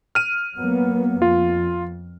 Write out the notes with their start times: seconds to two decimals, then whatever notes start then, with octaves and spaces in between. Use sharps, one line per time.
0.15 F6 D#7
0.57 F#3 A#3 B3
1.22 F2 F4